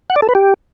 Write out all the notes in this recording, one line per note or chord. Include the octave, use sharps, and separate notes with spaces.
F#5
D5
A4
B4
G4